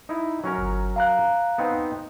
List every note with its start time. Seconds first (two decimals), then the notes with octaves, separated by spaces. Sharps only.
0.09 D#4 E4
0.44 F#3 C#4 A#4
0.58 G1
0.96 F5 A#5 F#6
1.58 B3 C4 D#4